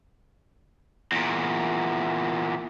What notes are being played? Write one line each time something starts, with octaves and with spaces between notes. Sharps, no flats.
E2 A#2